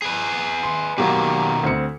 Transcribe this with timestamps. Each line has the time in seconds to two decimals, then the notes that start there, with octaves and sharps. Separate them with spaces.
0.02 G#4 B4
0.63 C6
0.98 B2 D#3 F#3 A#3 G4
1.63 D2 C4 C#7